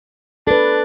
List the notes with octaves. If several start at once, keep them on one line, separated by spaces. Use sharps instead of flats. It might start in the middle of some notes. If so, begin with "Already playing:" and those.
D4 A4 B4